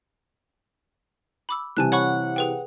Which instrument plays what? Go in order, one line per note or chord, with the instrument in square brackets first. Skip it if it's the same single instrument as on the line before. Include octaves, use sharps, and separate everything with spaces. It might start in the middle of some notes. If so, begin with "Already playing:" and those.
[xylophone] B5 D6 E6
[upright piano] C3 E3 G3 [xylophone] G#5 A5 F#6
[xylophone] C#5 B5 C#6 [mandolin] F#5
[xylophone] G#4 B4 G5